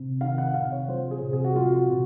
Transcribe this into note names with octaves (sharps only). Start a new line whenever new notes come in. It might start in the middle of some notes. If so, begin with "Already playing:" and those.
Already playing: C3
D#3 F5
F#5
C3 F5
C#5
F3 C5
G#4
C3
G#4
F#4
F3 F4
F#4
C3